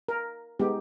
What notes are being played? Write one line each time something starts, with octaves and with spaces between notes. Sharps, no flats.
A#4
G#3 B3 D#4 G4